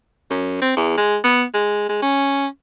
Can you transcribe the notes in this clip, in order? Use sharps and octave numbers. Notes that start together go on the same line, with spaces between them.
F#2
C4
E2
G#3
B3
G#3
G#3
C#4